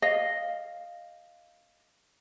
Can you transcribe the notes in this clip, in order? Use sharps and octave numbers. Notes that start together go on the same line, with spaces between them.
D#5 F5